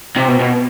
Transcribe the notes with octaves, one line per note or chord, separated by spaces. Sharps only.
C3
B2
B2